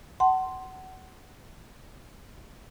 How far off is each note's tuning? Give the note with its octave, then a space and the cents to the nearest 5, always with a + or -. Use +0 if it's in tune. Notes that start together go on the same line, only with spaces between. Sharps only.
F#5 +20 A5 +0 C6 +0